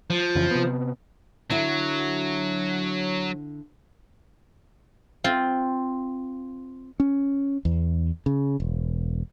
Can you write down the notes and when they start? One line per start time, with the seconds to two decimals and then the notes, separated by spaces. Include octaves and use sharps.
0.10 F3
0.35 F2 C#3 E3
0.51 C3 B3
1.50 D3 F#3 E4
5.24 C4 F4
7.00 C#4
7.65 E2
8.26 C#3
8.60 E1